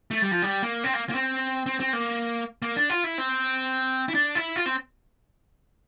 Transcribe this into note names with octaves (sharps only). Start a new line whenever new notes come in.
A3
G3
F3
G3
A#3
C4
A#3
A#3
C4
C4
C4
A#3
A#3
D4
F4
E4
C4
E4
D4
E4
F4
C4